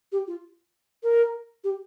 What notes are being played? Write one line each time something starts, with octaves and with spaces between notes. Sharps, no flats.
G4
F4
A#4
G4